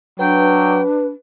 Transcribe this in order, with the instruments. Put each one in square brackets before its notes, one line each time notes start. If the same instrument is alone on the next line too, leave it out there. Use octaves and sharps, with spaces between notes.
[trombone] F#3 [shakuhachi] D4 [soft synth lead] B4 [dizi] G5